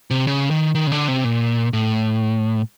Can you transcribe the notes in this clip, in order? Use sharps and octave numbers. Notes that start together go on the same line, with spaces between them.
C3
C#3
D#3
D#3
C#3
D3
C3
A#2
A2